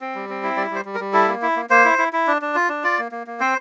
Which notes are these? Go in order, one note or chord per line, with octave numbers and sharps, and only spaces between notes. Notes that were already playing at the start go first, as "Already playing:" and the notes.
C4
G3
C4
E4
G3 D5
G3 C5
G3
A#4
G3
E4 A4
A#3
E4
A#3
A#3 C5
E4
E4
E4
D4
D4
F4
D4
F4 D5
A#3
A#3
A#3
C4 C5